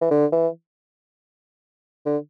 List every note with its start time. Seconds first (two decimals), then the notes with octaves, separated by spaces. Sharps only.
0.01 E3
0.11 D3
0.32 E3
2.06 D3